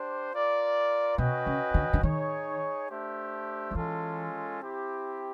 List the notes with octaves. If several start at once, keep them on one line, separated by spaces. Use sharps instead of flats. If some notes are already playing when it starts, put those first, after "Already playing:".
Already playing: D4 G4 C5
F4 A#4 D5
B2 C#4 F#4 B4 D#5 G5
C#3
D3
D3
D#3 D#4 G#4 C#5
A3 D4 G4 C5 E5
F3
E3 G#3 C#4 F4 A4
C4 E4 G4